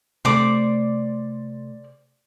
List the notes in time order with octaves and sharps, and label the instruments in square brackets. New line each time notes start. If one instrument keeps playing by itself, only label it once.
[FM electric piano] C3 A3 [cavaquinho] C5 D5 D6